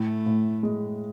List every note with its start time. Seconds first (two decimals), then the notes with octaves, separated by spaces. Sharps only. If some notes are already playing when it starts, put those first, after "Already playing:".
Already playing: A2 A3
0.26 A2
0.63 G#3